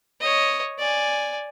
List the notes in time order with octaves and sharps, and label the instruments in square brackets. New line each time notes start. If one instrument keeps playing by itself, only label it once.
[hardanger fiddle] C#5 D#5
D5 G#5